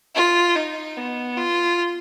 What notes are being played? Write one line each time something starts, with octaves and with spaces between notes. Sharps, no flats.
F4
D#4
B3
F4